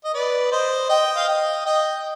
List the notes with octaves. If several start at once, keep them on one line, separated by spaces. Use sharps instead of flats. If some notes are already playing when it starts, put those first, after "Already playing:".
D#5
B4 D5
C5 D#5
D#5 G5
F5
D#5 G5
D#5 G5